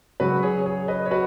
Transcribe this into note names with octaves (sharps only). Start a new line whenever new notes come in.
C#3 F#3 F#4 B4
G#4 C#5
G#4 C#5
B4 D#5
C#5
F#4 B4